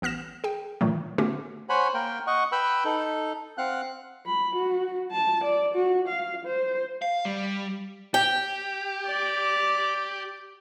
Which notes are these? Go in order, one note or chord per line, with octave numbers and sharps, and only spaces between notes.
A1 B3 F6 A#6 E7
G#4 G5
G2 A#2 D#3 E3 F#3 A3
D3 A3 B3 C#4 F#4 G4
C5 C#5 F#5 G#5 B5
A#3 A#4 G5
D#5 F#5 C#6
B4 G5 B5 E6
D#4 A4
C4 F5 F#5 F#6
B5
F#4
A5
D5
F#4
F5
C5
F5
G3
G4 G5
D5